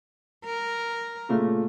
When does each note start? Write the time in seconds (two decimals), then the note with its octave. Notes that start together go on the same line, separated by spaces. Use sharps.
0.44 A#4
1.29 A#2 C#3 A3